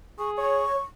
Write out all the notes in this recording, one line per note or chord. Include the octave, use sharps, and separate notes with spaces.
G#4 C#6
C#5 C#6